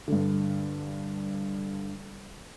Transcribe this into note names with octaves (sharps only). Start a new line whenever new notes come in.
G2 D3